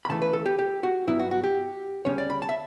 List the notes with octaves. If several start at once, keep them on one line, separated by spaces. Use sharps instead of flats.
B5
D2 C#3 E3 A3 A5
B4
A4
G4
G4
F#4
G2 F#3 B3 E4
F#4
F#4
G4
D2 C#3 G3 C#4 C#5
D5
B5
A5
E5